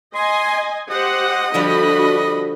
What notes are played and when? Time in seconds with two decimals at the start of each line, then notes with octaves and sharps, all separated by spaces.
0.15 D#5 G#5 C6
0.90 G4 C5 D#5 F#5
1.54 D3 F3 G3 D4 F#4 B5